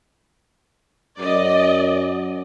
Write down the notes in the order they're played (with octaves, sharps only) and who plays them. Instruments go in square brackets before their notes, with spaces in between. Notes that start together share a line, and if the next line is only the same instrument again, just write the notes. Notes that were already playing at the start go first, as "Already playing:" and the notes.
[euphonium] F#2 [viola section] D5 D#5